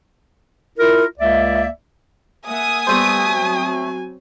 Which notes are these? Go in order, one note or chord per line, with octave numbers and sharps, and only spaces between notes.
E4 F4 A#4
C#2 A#3 D5 E5
A#3 E5 F#5 G#5 D#6
G3 A3 B3 G4 C5
F#3 C4